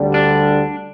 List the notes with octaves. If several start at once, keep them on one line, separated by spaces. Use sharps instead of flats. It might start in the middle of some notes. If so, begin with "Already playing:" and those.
Already playing: D2 D3 G3
D4